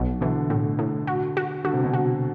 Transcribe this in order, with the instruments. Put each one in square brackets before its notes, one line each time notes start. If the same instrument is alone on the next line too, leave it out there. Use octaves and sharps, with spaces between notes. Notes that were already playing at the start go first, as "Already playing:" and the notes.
Already playing: [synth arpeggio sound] B1 [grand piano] B2
[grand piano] B2 D3 [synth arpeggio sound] E3
[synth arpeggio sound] A2
A2
F#4
F#4
[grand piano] D3 [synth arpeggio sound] F#4
[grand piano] C3
B2 D3
[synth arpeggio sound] F#4